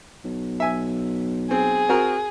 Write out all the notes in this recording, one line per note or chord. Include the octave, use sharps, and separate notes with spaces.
B1
E5 G#5
C4 G#4
C4 F#4 A#4